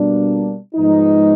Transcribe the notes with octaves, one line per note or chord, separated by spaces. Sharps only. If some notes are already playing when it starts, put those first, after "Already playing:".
Already playing: B2 G3 A#3 D4
G#2 F3 G#3 B3 D#4